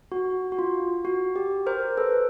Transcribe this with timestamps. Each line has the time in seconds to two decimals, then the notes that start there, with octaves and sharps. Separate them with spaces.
0.12 F#4
0.52 F#4
0.58 F4
1.05 F#4
1.36 G4
1.66 A#4 C5
1.97 A4 B4